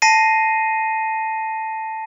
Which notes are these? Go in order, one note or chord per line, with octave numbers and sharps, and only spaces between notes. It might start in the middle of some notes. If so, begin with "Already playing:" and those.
A5 A#6 C7 D#7